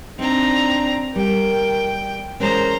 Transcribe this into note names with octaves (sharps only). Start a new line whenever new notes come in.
C4 D4 D#4 A#5
G3 A#4 G5
E3 G#3 C#4 A#4 C5 A#5